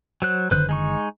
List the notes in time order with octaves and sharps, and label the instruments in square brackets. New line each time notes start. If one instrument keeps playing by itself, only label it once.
[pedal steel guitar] F#3 C5 F#6
[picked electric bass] F#1 D3 D#3 [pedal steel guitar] B4 C5 F#6
[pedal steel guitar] G#3 D#4 C#6